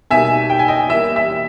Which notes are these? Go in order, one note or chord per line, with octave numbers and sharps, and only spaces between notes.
B2 G3 A#3 D#4 E5 G#5
G5
G#5
D#5 G5
E3 G3 A#3 E5
E5